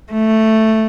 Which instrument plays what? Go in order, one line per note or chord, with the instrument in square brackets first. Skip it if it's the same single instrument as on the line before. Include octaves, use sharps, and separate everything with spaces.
[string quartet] A3